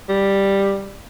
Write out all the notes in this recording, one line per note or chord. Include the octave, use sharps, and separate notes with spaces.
G3